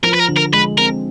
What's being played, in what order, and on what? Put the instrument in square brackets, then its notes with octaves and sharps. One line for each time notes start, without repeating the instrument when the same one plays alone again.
[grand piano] F3 [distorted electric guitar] A#4
[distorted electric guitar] B4
A#4
[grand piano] D3
[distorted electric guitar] A#4
[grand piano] G#3 [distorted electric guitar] B4
[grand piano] C4 [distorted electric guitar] A#4